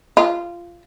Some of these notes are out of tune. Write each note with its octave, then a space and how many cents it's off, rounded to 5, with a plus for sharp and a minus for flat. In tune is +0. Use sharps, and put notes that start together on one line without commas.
F4 -15